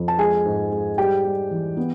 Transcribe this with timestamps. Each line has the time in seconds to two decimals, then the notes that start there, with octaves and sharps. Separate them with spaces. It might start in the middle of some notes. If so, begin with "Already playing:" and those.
Already playing: F2
0.08 A5
0.18 G#3 G#4 G#5
0.45 G#2
0.71 G#3
0.98 G3 G4 G5
1.25 G3
1.51 E3
1.77 B3